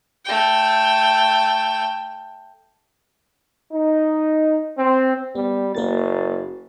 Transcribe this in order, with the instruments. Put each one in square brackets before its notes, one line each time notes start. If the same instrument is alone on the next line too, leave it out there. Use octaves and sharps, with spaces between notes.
[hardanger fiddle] A3 G5
[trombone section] D#4
C4
[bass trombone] G3 [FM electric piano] B3
[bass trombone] F#1 [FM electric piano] A#3 A#4 A6